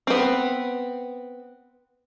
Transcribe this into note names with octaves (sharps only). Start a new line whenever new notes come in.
B3 C4